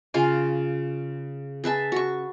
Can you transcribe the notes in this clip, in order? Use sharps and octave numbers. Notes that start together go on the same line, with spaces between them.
C#3 F4 F5 G#5
G#4 B4 E5 A5
F#4 C#6